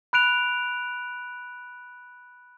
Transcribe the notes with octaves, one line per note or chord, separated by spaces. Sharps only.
B5 F#6 D7 F7